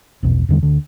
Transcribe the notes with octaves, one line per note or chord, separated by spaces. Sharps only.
A#1 E2 B2
E2 D3 G3
D2 D3